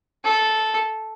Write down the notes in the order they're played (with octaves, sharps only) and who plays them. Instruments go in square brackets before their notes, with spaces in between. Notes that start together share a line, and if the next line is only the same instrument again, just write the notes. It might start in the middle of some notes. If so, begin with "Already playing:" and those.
[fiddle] A4